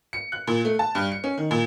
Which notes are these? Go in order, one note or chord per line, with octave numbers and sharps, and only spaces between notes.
C#7
F#6
A#2
A3
A5
G2
C#7
C#4
D#3
A#2